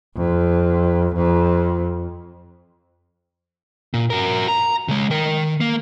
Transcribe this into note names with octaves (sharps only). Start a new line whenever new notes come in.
F2
F2
A#2
F#4 A#4
A#5
C#3 G#3
D#3 A#4
A#3